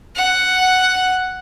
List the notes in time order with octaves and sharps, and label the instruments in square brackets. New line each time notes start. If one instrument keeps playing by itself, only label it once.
[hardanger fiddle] F#5